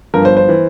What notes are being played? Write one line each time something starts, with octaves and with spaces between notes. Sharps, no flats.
G1 G2 F3 A#4
C5
C5
E3